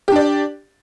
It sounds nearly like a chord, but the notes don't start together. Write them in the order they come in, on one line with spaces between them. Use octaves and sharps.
G4 D4 D5